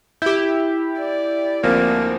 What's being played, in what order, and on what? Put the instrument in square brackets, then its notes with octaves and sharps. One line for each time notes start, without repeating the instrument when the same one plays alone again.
[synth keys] E4 G4 [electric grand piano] G6
[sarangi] D5
[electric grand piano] D2 F3 C4 [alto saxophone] A#3